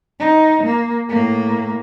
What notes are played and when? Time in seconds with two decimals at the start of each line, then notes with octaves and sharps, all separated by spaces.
0.20 D#4
0.64 A#3
1.09 A2 A#3